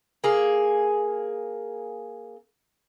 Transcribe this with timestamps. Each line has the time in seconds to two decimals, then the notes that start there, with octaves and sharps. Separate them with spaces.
0.24 A#3 G#4